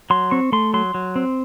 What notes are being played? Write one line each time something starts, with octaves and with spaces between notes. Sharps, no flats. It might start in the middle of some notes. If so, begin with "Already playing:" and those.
F#3 C6
C4 C#6
A3 C6
F#3 C6
F#3
C4